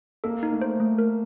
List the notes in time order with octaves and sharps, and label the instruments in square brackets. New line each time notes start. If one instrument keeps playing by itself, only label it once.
[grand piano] A#3 [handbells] A4
[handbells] D#4
[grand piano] A3
[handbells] C5
A3
A#4